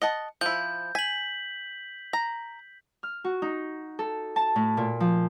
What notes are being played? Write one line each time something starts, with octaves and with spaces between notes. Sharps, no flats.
D#5 F#5 A5
F3 E4 G6
G#5 B6 F#7
A#5
F6
F#4
D#4
A4
A5
A2
A#2
F3